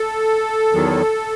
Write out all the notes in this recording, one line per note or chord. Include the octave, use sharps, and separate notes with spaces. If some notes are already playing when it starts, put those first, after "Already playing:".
Already playing: A4
E2 D#3 F#3